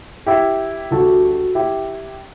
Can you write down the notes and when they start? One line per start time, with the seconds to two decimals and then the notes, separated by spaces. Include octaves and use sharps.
0.26 E4 G4
0.91 D2 D3 G3 F#4 A4
1.55 E4 G4